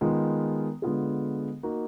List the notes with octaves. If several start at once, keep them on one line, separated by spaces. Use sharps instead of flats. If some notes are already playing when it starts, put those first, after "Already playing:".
D#3 G#3 B3 F4
D3 G#3 B3 F4 G#4
A#3 D#4 F#4